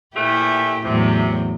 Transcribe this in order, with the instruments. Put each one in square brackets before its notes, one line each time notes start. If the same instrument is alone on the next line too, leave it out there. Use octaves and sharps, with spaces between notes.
[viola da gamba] A#2 E4 G4 [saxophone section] E3 F3 A3
[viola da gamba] E2 A2 F#3 [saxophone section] C3